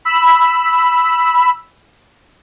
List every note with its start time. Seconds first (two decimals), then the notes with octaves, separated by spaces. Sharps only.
0.05 B5 E6